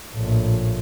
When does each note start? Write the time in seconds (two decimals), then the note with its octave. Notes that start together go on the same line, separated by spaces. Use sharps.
0.13 A#1 A2